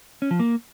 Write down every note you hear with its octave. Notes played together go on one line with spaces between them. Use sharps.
C#4
F3
A#3